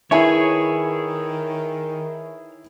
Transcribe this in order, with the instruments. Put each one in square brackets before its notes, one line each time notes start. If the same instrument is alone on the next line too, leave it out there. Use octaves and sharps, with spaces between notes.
[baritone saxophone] D#3 [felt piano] E4 E5 G#5 [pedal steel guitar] G#4 B4 C#5